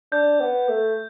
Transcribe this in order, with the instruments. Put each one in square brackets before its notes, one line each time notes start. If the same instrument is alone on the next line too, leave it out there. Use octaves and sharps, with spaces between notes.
[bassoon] D4 [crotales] G6
[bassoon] B3
A3